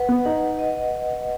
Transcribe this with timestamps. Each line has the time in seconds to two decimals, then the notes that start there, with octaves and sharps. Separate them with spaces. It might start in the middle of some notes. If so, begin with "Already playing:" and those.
Already playing: B4 F#5
0.09 B3
0.25 D#4 F#5
0.59 D#5